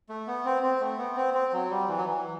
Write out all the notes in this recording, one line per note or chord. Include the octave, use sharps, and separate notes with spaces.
A3
B3
C4
C4
A3
B3
C4
C4
F#3
G3
E3
F#3
E3